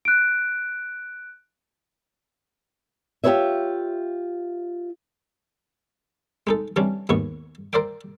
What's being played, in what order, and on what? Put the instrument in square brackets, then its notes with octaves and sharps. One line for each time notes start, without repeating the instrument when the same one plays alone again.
[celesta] F#6 D7
[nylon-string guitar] F4 G4 G#4 B4 C#5 E5
[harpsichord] G#3 D#4 A4
C3 E3 G3 C#4 D4
D#2 G#2 B3 C#6
A#4 C5 D5 E5 G5